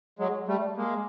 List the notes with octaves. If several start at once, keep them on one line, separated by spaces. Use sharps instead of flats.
F#3 G#3
G3 A3
G#3 A#3